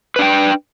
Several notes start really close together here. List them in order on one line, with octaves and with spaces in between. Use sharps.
B4 D4 G5